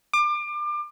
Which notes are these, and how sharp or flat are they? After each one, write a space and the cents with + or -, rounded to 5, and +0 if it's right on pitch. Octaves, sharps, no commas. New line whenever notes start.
D6 +30